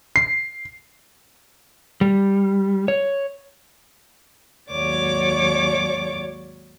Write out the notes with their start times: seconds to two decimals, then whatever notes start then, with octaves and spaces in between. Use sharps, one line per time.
0.16 C7
2.01 G3
2.88 C#5
4.71 D#2 G#2 F#3 C#5 D5 D6